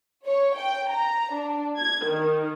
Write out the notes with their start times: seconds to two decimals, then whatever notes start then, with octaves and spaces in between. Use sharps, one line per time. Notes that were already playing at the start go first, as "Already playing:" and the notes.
0.26 C#5
0.58 G5
0.92 A#5
1.34 D4
1.77 G#6
2.06 D#3